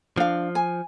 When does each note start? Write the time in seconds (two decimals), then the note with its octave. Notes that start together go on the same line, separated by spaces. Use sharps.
0.18 F3 D4 F5
0.55 G#5